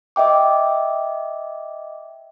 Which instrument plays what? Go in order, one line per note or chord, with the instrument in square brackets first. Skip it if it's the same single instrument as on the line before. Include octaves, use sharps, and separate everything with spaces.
[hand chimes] D#5 E5 G5 D6